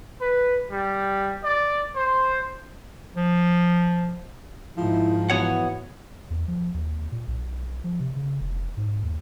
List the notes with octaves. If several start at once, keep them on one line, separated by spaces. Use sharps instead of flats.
B4
G3
D5
C5
F3
G#2 D#3 F3 E4
E3 B3 F#4 C#5 F#5
E2
F3
D#2
A#2
B1
F3
C3
C#3
F1
G#2
D#2